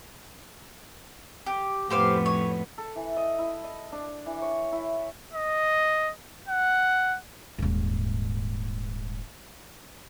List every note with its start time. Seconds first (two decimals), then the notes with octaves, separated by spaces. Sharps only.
1.46 G4
1.90 F2 A2 B3 G4 C5 F5
2.26 C#5
2.78 A4
2.96 E3
3.17 D#5
3.39 E4
3.64 D#5
3.92 D4
4.26 E3
4.41 C#5
4.72 E4
5.34 D#5
6.48 F#5
7.58 D#1 G#2